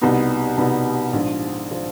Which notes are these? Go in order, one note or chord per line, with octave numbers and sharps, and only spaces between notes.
C2 B2 G3 B3 D#4
C2 B2 G3 B3 D#4
A#1 G#2 F3
F3